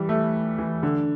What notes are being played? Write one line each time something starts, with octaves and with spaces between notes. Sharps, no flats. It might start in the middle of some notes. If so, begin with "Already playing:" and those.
Already playing: E3 G3
A3
E3
D3